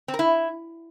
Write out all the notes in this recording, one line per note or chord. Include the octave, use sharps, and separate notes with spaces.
C4
A#4
E4